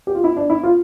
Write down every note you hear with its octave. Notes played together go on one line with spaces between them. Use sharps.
G4
F4
E4
D4
E4
F4